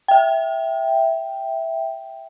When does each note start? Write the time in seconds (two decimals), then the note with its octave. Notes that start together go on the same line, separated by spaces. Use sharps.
0.08 E5 G5